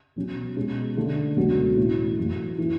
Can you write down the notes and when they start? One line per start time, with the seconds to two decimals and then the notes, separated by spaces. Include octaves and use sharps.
0.16 B2 F#3 C#4
0.56 B2 G#3 C#4
0.97 D3 A3 D4
1.37 C#2 B2 F#3 C#4 F#4
1.77 A2 E3 A3
2.17 F#2 E3 A3 C#4 F#4
2.58 E3 A3